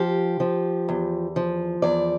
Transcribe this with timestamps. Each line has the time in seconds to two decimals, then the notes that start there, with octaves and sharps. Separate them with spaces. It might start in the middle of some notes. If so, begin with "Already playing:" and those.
Already playing: F3 G4
0.40 F3
0.89 E2
1.36 F3
1.82 E2 D5